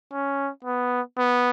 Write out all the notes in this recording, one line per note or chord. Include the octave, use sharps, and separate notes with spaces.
C#4
B3
B3